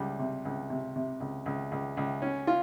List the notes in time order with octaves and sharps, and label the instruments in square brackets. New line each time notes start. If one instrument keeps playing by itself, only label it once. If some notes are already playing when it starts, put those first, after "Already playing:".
Already playing: [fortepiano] C#2 G3
C3
C#2
C3
C3
C#2
C#2
C#2
C#2
C#4
F4